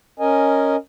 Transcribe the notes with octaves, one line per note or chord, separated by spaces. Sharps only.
C#4 A#4 D#5 G#5